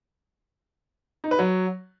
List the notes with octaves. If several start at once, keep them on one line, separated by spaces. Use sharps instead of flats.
D#4
B4
F#3